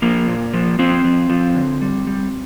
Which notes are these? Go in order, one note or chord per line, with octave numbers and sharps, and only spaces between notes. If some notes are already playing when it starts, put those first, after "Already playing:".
F3 A#3
A#2
F3
F3 C4
F3
F3
D3
G3
G3